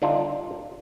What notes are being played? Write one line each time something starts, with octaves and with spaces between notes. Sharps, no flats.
D3 G3 D4 D#4 F4